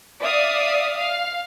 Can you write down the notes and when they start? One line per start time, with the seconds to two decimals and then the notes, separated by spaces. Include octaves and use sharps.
0.21 D5 E5 F5 D#6
0.98 F5